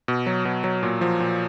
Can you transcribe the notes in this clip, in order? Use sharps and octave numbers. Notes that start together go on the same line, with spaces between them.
B2
F#3
B2
F#3
A#2
F3
A#2